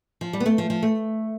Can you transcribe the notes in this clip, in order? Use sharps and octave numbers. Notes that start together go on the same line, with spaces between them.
F3
G3
B3
A3
F3
F3
A3